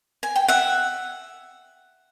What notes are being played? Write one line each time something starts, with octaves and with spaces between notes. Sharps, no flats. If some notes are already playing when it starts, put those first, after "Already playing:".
G#5
G5
E5 F#5